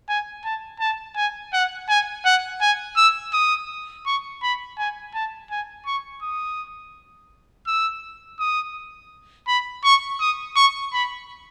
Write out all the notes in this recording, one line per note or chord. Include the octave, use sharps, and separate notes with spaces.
G#5
A5
A5
G#5
F#5
G#5
F#5
G#5
E6
D#6
C#6
B5
G#5
A5
G#5
C#6
D#6
E6
D#6
B5
C#6
D#6
C#6
B5